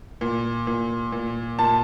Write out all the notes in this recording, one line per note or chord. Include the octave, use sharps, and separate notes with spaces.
A#2
A#2
A#2
A#2 A5